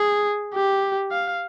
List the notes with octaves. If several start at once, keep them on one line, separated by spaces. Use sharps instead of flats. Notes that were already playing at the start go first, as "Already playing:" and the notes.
Already playing: G#4
G4
F5